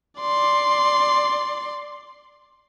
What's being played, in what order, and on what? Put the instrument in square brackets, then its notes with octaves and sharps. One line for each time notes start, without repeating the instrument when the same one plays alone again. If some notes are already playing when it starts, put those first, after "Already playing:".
[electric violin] D5 C6